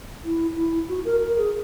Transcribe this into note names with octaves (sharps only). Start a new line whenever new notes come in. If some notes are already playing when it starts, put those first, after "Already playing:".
E4
E4
F#4
A#4
A#4
G#4